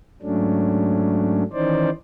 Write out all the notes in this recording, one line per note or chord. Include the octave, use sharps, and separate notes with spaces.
G#2 F#3 A3 C#4 D4
D#3 E3 C#4 D#4 C5 D5